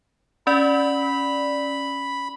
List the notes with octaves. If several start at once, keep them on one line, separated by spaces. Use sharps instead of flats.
C#4 D5 B5